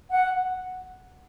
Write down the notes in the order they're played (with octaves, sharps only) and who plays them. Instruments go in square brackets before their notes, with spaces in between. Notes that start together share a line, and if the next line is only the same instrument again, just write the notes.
[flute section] F#5